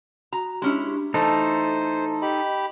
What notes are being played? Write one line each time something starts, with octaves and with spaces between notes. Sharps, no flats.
F#4 A#5
G#3 C#4 D4 E4 G4
E3 A3 D#4 A4 C5 A5
G4 D#5 B5